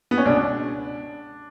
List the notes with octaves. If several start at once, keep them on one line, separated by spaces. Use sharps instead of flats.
B3
C#4
C#2 B2 D4